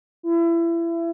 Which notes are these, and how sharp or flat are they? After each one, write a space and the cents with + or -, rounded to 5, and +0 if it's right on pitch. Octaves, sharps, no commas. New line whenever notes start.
E4 +30